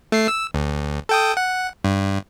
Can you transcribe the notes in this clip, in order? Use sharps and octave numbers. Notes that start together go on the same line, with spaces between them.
A3 C7
E6
D2
A4 G5 D#6
F#5
G2